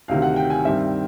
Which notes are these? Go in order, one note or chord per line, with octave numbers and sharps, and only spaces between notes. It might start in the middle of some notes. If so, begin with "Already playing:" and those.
D2 C3 D#3 F5
F#5
G5
G#5
G2 D#3 G3 C4 E5